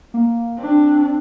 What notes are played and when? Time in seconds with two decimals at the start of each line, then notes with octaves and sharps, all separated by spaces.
0.14 A#3
0.58 C4 D4